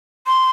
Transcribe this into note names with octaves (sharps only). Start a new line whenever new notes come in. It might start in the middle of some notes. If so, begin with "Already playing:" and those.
C6